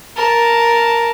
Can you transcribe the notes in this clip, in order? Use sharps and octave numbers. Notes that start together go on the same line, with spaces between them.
A#4 A5